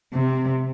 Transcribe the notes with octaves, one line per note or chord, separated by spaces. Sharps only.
C3